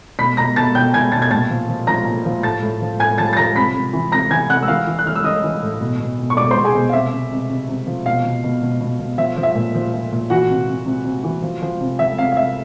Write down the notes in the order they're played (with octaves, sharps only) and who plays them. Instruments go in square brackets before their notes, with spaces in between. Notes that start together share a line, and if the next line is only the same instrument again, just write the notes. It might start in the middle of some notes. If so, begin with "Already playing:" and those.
[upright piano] B2 B5 B6
B2 A#5 A#6
B2 A5 A6
B2 G5 G6
B2 G#5 G#6
B2 A5 A6
G#6
A#2 A5 A6
F3
F3
F3 A#5 A#6
A#2
F3
A2 A5 A6
A2
F3
A2 G#5 G#6
F3 A5 A6
A6
F3 A#5 A#6
C3 B5 B6
C3
E3
C3 A#5 A#6
E3 G#5 G#6
C3 F#5 F#6
E6
E3 F5 F6
E3
F#6
E3 F6
E6
E3 D#5 D#6
E3
A2
B2
B2
B2
C#6
B2 D5 D6
C5 C6
B2
G#4 G#5
B2
F5
C3 E5
C3
C3
C3
C3
F3
B2 F5
B2
B2
B2
B2
B2
F3 E5
F3
E5
A#2
F3
F3
A#2
E3 F#4 F#5
C3
C3
C3
C3
E3
F3
F3
C3
F3 E5
C3 F5
F5
C3 E5